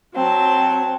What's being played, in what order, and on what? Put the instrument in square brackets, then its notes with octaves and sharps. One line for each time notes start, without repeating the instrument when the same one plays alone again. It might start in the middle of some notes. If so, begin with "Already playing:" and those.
[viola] F#3 A5 [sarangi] C4